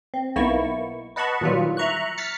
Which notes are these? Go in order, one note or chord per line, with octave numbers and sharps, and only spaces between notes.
C4
B1 A#3 B3 D#4 E4 C#6
B4 D#5 F#5 A5 B5 C#6
A#2 D#3 E3 F#3 G3 F4
E5 A#5 C#6 F#6
F6 A6 B6 C#7